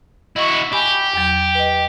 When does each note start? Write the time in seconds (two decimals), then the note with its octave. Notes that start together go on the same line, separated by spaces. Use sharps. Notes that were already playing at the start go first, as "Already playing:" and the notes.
0.36 E4 F#4 D#5 C#6
0.73 G4 G#5 B5
1.14 E2 F#3
1.55 B4 D#5